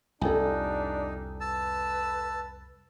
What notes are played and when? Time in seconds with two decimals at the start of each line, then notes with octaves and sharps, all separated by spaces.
0.21 C2 F2 D4 D#4 A4 G5 G#5
1.40 B4 A5 E6